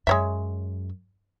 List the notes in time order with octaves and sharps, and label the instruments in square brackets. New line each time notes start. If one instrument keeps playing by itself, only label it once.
[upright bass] F#2 [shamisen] G#3 C#5 E5